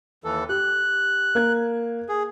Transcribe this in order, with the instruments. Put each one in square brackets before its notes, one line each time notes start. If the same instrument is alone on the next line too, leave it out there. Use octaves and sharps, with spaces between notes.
[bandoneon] D#2 E3 A4
[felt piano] G4 [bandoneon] F#6
[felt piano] A#3 G#6
[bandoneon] G#4